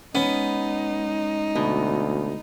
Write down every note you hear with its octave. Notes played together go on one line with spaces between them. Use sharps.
G#3 B3 C#4 D#4
D2 B2